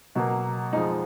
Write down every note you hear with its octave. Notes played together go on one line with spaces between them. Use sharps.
B2 F#3 A#3
F2 F3 G#3 D#4